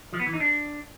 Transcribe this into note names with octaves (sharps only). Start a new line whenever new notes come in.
F3
B3
E3
D#4
D4